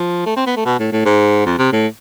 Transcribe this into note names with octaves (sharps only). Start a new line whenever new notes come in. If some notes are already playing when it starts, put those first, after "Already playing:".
Already playing: F3
A3
C4
B3
A3
B2
A2
A2
G#2
F2
C3
A2